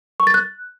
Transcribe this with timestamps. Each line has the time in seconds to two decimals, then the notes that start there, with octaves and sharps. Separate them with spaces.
0.20 C#6
0.27 A6
0.34 F#6